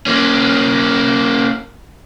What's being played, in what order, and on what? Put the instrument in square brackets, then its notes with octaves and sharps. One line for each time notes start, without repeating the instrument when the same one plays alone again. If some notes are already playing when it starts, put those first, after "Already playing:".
[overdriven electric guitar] A#3 C#4